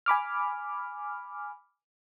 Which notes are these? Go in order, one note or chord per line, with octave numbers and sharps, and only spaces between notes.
G#5 B5 D6 F6